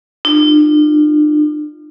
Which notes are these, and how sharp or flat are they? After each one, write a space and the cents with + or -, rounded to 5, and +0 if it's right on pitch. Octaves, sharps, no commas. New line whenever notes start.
D4 +45 F4 -10